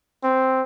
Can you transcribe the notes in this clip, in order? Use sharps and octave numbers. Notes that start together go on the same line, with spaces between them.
C4